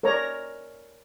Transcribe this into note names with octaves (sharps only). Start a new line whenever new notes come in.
A#4 C#5 D5 A#5